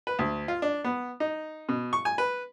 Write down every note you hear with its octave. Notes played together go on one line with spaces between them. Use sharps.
B4
D2
F4
D4
B3
D#4
B2
C#6
G#5
B4